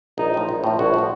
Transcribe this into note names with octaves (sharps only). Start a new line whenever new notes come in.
A#1 D#4
A2 F3
A#1
A2 F3
A#1 F#4
A2 F3